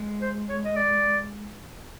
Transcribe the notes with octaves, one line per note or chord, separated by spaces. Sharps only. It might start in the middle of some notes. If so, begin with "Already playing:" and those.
Already playing: G#3
C5
C#5
D#5
D5